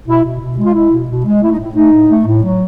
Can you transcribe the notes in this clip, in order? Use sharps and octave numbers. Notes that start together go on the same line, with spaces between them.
B2 E4
B2
B2
G#3
F4
G#3 E4
B2
B2
G#3
A3 E4
D#4
A2 E4
A3 D#4
A2
A3
A2
F#3